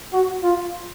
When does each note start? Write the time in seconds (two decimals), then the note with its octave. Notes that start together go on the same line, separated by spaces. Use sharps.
0.13 F#4
0.43 F4